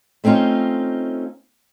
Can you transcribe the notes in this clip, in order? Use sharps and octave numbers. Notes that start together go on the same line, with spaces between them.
A3 C4 C#4 D#4 F4